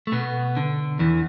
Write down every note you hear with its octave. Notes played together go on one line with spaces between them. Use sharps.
A3
B2 B3
D3
E2 E3